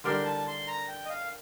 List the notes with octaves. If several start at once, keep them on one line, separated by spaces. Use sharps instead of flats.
D3 G3 D4 G4 A#4 C6
A5
C6
A#5
G5
D#5
F5